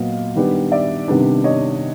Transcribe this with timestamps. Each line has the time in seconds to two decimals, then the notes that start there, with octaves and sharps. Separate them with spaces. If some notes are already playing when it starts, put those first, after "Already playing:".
Already playing: A#2 F#3 B3 D#5 F5
0.36 D#3 G3 B3 D4
0.72 D5 E5
1.08 C3 D#3 G3 B3 D4
1.44 C#5 D#5